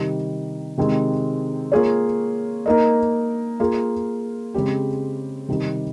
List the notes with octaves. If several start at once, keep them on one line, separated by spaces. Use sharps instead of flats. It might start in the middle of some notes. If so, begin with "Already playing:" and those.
Already playing: C3 D#3 G3
C3 D#3 G#3 C4
A#3 F4 G#4 C#5
A#3 D#4 A#4 D#5
A#3 F4 G#4
C#3 G#3 C4 G4
C3 D#3 G3